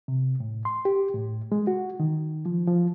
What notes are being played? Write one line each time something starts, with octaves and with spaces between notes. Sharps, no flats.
C3
A2
C6
G4
A2
G#3
F#4
D#3
F3
F3